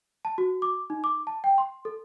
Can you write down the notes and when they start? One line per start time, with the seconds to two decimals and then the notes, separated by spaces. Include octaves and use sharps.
0.25 A5
0.38 F#4
0.62 D6
0.90 D#4
1.04 D6
1.27 A5
1.44 G5
1.58 C6
1.85 A4